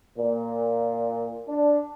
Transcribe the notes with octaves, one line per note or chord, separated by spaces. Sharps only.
A#2
D4